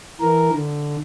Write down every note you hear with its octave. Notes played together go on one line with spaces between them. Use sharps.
E3 A#4
D3